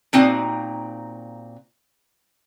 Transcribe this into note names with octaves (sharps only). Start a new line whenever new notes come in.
A#2 C4 D#4 F#4 F5